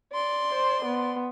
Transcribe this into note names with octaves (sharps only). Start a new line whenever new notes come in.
D5 C6
C5
B3